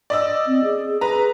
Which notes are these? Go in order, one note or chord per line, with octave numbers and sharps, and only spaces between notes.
D5 D#5 E6
C4
G#4
G#4 B4 A#5